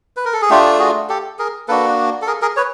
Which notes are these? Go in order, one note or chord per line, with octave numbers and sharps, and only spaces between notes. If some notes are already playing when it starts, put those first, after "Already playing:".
B4
A#4
A4
G#4
A3 D4 F4 G4
F#4 G#4
G4 A4
G#4 A#4
A#3 D4 F#4 A4 B4
A4
G#4 A#4
G#4 A#4
B4 C#5